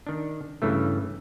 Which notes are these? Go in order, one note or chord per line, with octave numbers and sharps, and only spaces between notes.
D#3 D4
G2 C#3 E3 A3